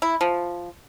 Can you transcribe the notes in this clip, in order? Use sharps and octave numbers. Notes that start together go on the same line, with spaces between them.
E4
F3